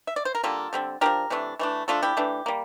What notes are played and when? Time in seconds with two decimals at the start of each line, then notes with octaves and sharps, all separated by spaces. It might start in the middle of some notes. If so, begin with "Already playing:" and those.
0.07 E5
0.16 D5
0.25 C5
0.35 A#4
0.43 D3 G3 A#3 F4 A4
0.73 D3 G3 C4
1.01 F3 A#3 D4 G4 A#4
1.30 C3 E3 A3 D4
1.59 E3 A3 D4
1.88 F3 A3 D4 F4 A4
2.03 E4 G4
2.17 E3 A3 D4
2.46 G3 A#3